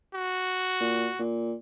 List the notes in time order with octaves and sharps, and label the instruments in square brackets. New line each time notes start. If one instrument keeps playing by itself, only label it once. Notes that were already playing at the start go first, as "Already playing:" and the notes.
[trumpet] F#4
[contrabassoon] A#2
A#2